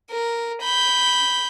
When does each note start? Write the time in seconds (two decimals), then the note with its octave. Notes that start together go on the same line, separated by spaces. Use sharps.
0.11 A#4
0.62 B5 G6